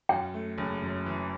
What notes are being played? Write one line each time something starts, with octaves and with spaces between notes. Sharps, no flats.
F#2 G5
A3
F#1
F#2
E3